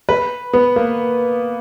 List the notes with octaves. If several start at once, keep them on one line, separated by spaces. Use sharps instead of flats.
B4
B3
A#3